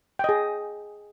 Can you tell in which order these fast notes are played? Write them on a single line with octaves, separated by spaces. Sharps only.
G5 D#5 G#4